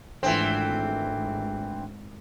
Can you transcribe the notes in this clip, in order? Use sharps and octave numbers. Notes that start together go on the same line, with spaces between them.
G#1 D3 E3 A3 C4 F4